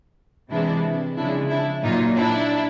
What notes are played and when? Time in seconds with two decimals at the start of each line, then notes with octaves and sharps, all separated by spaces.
0.50 C3 E3 G#3 D4 E4
1.16 C#3 F3 G#3 D4 E4
1.50 D4 E4
1.83 A#2 F#3 D#4 F4
2.16 D4 E4